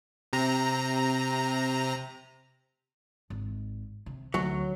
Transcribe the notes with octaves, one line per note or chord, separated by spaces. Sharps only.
C3 A#5
G#1
C3
D2 F#3